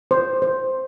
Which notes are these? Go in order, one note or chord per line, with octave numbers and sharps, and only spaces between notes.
C5
C5